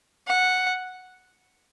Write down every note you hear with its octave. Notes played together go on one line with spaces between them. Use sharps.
F#5